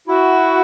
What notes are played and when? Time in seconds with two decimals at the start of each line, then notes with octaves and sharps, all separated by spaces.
0.08 E4 F#4